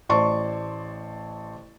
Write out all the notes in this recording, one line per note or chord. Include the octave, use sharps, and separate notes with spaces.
A1 C5 D5 A5 C6 C#6